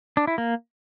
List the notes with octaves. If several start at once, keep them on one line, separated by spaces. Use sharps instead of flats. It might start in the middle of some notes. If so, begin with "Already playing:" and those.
D4
E4
A#3